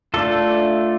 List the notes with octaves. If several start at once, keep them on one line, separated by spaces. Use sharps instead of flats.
A3 D4 F4 A4